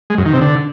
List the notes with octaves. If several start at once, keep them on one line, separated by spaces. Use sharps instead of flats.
G#3
F#2
D#3
C3
D3